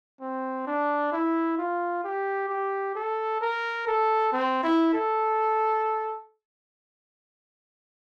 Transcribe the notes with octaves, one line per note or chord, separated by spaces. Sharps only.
C4
D4
E4
F4
G4
G4
A4
A#4
A4
C4
E4
A4